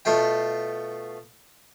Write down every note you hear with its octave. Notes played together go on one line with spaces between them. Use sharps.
B2 A3 F4 G5